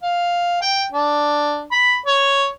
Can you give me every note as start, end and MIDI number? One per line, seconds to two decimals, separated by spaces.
0.03 0.60 77
0.62 0.84 79
0.93 1.62 62
1.72 1.95 83
2.06 2.48 73